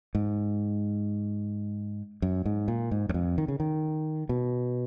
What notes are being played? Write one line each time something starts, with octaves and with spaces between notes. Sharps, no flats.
G#2
F#2
G#2
A#2
G#2
F#2
F2
D#3
C#3
D#3
B2